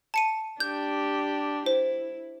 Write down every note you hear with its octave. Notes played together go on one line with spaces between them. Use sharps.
A5 C#7 D#7
D4 G4 G6
E4 C5